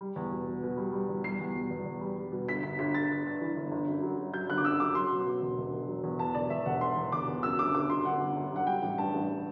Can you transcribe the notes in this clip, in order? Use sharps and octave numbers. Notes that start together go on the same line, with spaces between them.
G3
E2
B2
B2
B2
G3
G3
E2
G3 C7
E2
B2
E2
E2
G3
G3
B2
G1 B6
G1 B6
G1 B6
G1 A6
G1
G2
E3
G1
G1
F#2
F#3
F#3
F#3 G6
G1 F#6
D6
F#2 E6
F#2 D6
F#3 C6
B2
B2
E1
E1
E1
F#3
E2
E2 A5
E1 D5
E2 E5
E1 F#5
E1 C6
E2
E1 D6
E2
F#2 E6
G1 D6
G1 D6
F#2 C6
G1 F#5
G1
G1
F#3 F#5
G3 G5
A1
G2 A5
A1